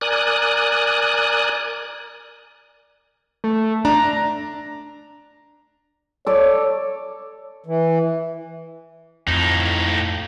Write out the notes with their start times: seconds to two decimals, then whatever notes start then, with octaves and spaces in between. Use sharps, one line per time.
0.01 A#4 D5 G#5 D#6 F#6
3.44 A3
3.85 D4 A#5
6.27 A4 C#5 D5
7.66 E3
9.28 F2 A2 D#4